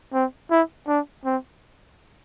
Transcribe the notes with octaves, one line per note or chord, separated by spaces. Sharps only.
C4
E4
D4
C4